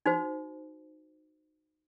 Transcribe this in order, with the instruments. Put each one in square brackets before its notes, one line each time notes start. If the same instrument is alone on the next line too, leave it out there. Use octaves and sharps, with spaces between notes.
[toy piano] D#4 F#4 C5